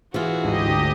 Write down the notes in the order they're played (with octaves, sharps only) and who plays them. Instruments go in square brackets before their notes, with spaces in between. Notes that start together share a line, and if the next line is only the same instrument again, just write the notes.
[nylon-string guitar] E3 F4 [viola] F#4 G#4
[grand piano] G#1 [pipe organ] D2 G4 D#5